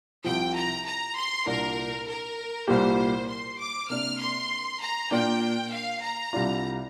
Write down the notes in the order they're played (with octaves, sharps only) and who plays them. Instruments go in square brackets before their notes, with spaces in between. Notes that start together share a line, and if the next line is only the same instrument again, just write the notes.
[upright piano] C2 C3 F3 [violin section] G5
[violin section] A#5
A#5
C6
[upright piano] C2 A#2 A#3 D4 [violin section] A#4
[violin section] A#4
[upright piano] C2 A#2 G3 A#3 G4 [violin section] C5
[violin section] C6
D6
[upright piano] C3 A#3 D4 [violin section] F6
[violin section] C6
A#5
[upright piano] A#2 A#3 D4 [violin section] G5
[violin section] F5
A#5
[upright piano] C2 C3 G3 D4 F4